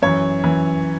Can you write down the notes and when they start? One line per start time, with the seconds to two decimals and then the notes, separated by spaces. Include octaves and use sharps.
0.02 F#2 E3 C#5
0.44 F#2 E3